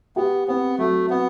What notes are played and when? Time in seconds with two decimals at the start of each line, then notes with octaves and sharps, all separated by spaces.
0.16 B3 G4
0.48 B3 C4
0.78 F#3 A3
1.10 B3 C4